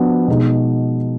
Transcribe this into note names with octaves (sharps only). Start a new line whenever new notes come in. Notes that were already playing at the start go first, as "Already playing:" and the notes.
Already playing: F3 B3 D4 F#4
B2 G#3 D#4